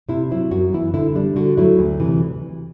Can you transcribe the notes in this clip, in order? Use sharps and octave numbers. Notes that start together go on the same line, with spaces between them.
C3 E4
F#3 C4 E4
F#2 F#4
E3 B3 E4
D3 E4
G3 D4
D3 F#4
F#3 A3 E4
D2
C3 E3